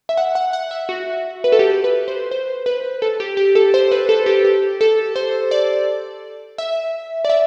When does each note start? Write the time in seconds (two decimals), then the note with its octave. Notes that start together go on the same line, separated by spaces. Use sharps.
0.09 E5
0.17 F#5
0.35 F#5
0.53 F#5
0.71 E5
0.89 F#4
1.44 B4
1.52 A4
1.59 G4
1.84 B4
2.08 C5
2.31 C5
2.66 B4
3.02 A4
3.20 G4
3.37 G4
3.55 A4
3.74 C5
3.92 B4
4.09 A4
4.26 G4
4.44 G4
4.81 A4
5.16 C5
5.51 D5
6.58 E5
7.25 D5
7.30 E5